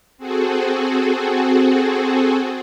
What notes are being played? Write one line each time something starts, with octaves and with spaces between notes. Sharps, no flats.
C4 F#4 G#4 A4